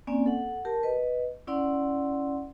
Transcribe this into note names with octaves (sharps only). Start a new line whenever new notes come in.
A#3 C4 C#4 D5 G#5
A4 F#5
G4 A#4 A5
B4 D#5
C#4 E4 D5 F#5 C6